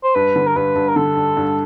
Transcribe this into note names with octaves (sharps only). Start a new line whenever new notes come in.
C5
G2 B4
D3
A#4
G2 B4
G2
A#4
D3 A4
G2
G2